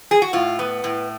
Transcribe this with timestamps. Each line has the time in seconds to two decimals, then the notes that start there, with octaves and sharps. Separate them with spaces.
0.11 G#4
0.22 F#4
0.33 A2 F4
0.59 B3
0.84 A2